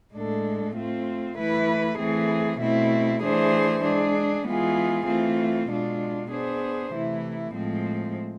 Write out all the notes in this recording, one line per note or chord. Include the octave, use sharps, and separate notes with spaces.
A2 G#3 D4 A4
A3 C4 F4
E3 A3 E4 B4
E3 A3 C4 G#4
B2 A3 C4 E4
E3 A3 D4 G#4 C5
G#3 D4 G#4
E3 G#3 B3 F4 G#4
E3 A3 C4 F4
B2 G#3 D4 F4
B3 D4 G#4 C5
C3 E3 A3 E4
A2 F3 G#3 C4